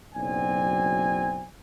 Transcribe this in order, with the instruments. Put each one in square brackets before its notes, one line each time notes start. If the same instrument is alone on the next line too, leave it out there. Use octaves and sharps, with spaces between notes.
[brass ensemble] F#1 B1 F#3 C4 D5 G#5